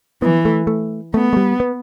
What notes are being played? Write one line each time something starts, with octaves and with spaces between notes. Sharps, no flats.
E3 B3
A3
A3
A3 B3
A3
G3
B3